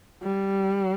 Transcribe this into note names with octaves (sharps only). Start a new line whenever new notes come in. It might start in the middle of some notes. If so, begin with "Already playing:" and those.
G3